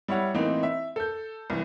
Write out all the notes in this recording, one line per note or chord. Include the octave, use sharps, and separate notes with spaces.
G3 E4 C#5 F#5
A2 E3 A#3 C4 D#4
E5
A4 G6
C2 E3